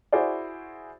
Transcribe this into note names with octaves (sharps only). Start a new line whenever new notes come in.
E4 F#4 G#4 C5 D5